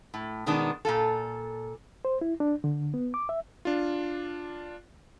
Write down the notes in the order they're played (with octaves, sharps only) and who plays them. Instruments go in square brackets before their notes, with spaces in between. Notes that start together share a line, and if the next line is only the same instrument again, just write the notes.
[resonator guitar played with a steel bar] A2
B2 D#3 G#3 B3 D4 D#4
A#2 F4 A4
[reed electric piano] C5
E4
D4
D3
B3
D6
E5
[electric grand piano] D4 F4